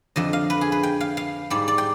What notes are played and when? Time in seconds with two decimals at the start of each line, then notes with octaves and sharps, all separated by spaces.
0.16 F2 D3 F3 D#5
0.33 F5
0.50 B4
0.61 G#4
0.72 B4
0.83 G5
1.00 F5
1.17 F5
1.50 G#2 G3 D5
1.68 D5
1.78 G5